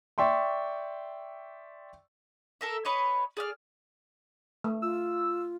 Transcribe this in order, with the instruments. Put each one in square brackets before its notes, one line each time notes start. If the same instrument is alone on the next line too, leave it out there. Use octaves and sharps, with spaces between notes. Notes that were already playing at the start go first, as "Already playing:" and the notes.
[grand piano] D5 E5 G5 C6 C#6
[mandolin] A4 A#4 E5
B4 C#5 D#5
G#4 D5 F6
[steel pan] A3
[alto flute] F4 [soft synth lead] E6